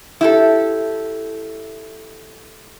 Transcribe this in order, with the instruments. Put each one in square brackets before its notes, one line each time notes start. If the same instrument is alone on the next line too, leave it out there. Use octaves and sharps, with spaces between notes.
[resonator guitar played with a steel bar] E4 G4 A4